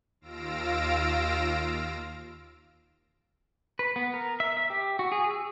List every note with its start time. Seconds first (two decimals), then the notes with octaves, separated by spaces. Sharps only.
0.21 D#2 F4 F5 E6 A#6 D7
3.79 B4
3.96 B3
4.14 A#4
4.40 E5
4.57 E5
4.70 G4
4.99 F#4
5.12 G#4
5.31 E6